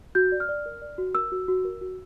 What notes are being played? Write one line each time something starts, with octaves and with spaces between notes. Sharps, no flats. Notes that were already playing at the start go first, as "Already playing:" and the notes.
F#4 G6
D5
F6
D5
A#4
D5
F#4
A#4 E6
F#4
F#4
A#4
F#4